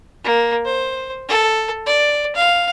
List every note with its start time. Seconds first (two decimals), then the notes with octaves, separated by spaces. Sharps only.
0.24 A#3
0.65 C5
1.29 A4
1.86 D5
2.35 F5